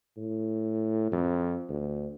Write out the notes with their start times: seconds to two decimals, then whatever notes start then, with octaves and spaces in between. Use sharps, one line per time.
0.17 A2
1.12 F2
1.69 D2